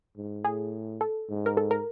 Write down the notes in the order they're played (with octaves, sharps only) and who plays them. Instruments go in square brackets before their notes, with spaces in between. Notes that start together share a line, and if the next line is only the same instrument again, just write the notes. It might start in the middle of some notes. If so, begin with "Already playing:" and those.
[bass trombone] G#2
[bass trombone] A2 [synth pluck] G#4
[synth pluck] A4
[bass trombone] G#2
[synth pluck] A#4
A4
A#4